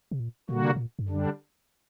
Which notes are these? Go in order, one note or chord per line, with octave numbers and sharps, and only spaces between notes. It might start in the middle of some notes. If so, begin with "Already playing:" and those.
C3
A#2
A#2 D3 G3 A#3 F#4
C3
A#2
G2
F#2 D3 G3 D4